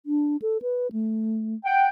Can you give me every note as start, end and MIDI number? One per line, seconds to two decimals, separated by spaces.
0.06 0.37 62
0.42 0.58 69
0.62 0.91 71
0.92 1.55 57
1.65 1.88 78
1.65 1.88 79